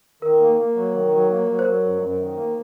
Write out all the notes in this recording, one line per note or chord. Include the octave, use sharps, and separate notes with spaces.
D#3 A#4
A#3
A#3
F#3
D#3
F#3
A#3
F#3
C5
F#3 A#4
F#2
F#2
D#3
A#3